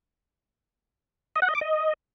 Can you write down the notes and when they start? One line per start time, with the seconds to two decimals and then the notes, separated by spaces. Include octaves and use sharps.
1.36 D#5
1.42 F#5
1.48 D#5
1.55 D6
1.61 D#5